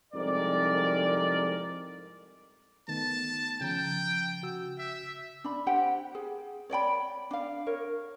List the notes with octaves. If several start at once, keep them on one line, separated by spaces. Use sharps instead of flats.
C2 F2 G#2 A#4 D5
D#3 A3 B3 A5
C#3 F3 G5 A#5
C#3 F#4 E6
E5
D4 B5
G4 C5 F#5 G5
G#4
C#5 D5 G5 B5
D4 F5
A#4 C#5